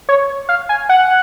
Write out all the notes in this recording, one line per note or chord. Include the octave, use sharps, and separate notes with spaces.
C#5
F5
G#5
F#5